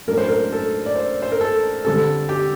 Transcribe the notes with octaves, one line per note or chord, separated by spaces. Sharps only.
A2 F#3 A#3 D4 A#4
C5
A#4
A4
D5
C5
C5
A#4
A4
D3 G3 C4 A4
G4